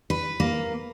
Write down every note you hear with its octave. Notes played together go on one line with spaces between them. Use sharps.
B4
A#3